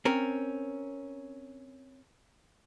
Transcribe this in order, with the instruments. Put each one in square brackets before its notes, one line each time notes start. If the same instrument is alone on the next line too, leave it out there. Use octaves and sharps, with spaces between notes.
[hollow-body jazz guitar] C4 C#4 A#4